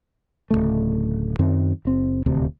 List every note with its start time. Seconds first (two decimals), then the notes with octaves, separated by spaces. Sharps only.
0.51 D1 D#2 C#3 A3
1.39 F#2 D#3 C4
1.85 F#1 C4
2.26 D#1 D2 C3